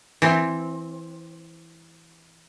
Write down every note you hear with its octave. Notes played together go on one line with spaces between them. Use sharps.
E3 C4